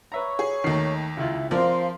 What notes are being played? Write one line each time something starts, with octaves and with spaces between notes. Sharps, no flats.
B4 C#5 E5 A#5 C#6
G#4
D#2 D#3 A3 C7
C#2 E4 F4 E5
F3 C4 A#4 C5 D5 F5 C6